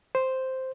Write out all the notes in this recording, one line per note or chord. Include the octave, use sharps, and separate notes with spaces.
C5